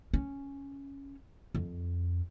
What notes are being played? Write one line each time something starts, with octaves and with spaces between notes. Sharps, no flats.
C#4
F2